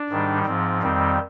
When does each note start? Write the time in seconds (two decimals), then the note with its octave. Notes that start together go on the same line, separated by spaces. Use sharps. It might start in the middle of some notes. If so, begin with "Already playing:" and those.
Already playing: D4
0.10 G#2 D#3 G3
0.46 G#2 F3 C4
0.83 F2 D#3 G3 C4